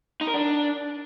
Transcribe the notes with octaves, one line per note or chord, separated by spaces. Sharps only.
D#4
A#4
D4